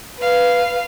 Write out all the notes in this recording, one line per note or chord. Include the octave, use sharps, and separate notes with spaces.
B4 F5